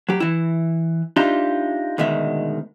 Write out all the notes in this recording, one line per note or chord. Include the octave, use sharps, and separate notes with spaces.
F#3 G4
E3 E4
D4 D#4 F4 G4 E5
D2 B2 D#3 G#3 E5